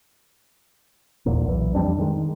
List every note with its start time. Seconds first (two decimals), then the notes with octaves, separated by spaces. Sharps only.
1.26 D#1 A#1 E2 A#2
1.47 B1 E3
1.75 F2 G3 C4 D4
1.98 D#3 G#3